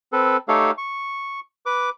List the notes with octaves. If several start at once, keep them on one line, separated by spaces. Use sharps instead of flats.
C4 A4 B4
A3 D#4 G4 A4 C#5 F5
C#6
B4 D6